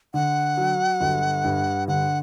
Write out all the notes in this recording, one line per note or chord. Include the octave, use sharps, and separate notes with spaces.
D3 F#5
F#3
G1
G2
D3 F#5